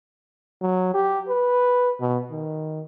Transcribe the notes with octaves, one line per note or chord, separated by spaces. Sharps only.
F#3
G4
B4
B2
D#3